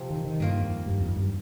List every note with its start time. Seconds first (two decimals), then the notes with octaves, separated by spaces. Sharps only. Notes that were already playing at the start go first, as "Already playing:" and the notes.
Already playing: C3 F3 C4
0.10 D#3
0.25 D#3
0.40 G2 D#3 A#3 F4
0.63 F2
0.86 G2
1.01 F2
1.16 G2